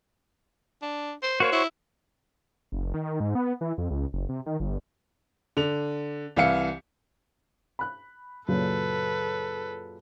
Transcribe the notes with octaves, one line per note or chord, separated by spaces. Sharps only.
D4
C5
A#3 F#4 C5 C#5
E4
F#1
D#3
G#2
B3
E3
F2
C#2
F#1
C3
D#3
G1
D3 F7
C2 E3 E5 F5 C#7
B5 F#6
F#2 A#2 C#3 A4 B4